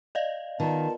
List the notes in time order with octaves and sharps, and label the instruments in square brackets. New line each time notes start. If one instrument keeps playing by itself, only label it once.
[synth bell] D5 D#5 F5
[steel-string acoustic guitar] D#3 [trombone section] B3 F4 A#4 [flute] A5